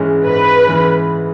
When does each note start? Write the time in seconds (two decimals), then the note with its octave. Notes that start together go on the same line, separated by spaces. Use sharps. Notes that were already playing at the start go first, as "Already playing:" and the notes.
Already playing: G#2 E3 G#3 C#4
0.25 G#2 B4
0.66 E3 G#3 C#4